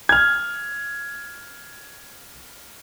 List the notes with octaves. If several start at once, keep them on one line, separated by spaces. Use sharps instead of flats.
F6 G#6